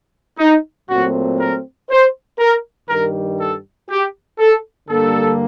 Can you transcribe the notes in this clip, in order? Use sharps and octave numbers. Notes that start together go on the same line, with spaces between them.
D#4
A#2 F#3 A3 C4 F#4
A#4
C5
A#4
G2 D#3 G3 A#4
A4
G4
A4
G2 D3 G3 A#3 A4